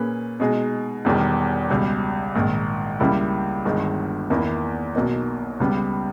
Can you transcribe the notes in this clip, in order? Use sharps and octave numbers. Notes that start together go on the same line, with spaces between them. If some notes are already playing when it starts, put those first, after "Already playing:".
Already playing: A#2 A#3 C#4 G#4 B4
B2 G#3 D#4 G#4
E1 E2 D#3 G3
C#2 B2 G3
A#1 G#2 D#3
C#2 C#3 G3 A#3 E4
G1 G2 D#3 G#3 D#4
E2 D#3 A#3 E4
B1 B2 A#3 D#4
C#2 C#3 G3 B3